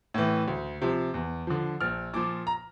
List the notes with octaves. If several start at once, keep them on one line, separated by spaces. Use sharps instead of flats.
A2 E3
D2
C3 F3
E2
D3 F3
A#1 F6
A#2 F3 D6
A#5